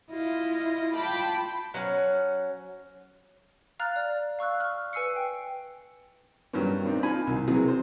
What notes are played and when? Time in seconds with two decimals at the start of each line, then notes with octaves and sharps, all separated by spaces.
0.10 E4 F4 D#5
0.93 F4 G5 A5 B5 D6
1.74 F#3 C#4 F#5
3.79 F5 A#5 F6 F#6 A6
3.96 D5
4.39 F5 C#6 E6 F#6
4.60 C#6 F6
4.93 B4 G#5 E6 C7 C#7
5.16 G5
6.53 G2 D#3 F#3 B3 C#4
6.86 C4 D4 D#4
7.03 D#4 F4 G#5 B5
7.27 C2 D#3
7.48 C3 E3 F#3 G#4
7.68 C5